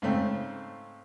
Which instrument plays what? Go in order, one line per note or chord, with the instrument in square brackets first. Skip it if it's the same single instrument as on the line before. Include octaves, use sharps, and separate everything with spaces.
[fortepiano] G#2 C#3 A3 C4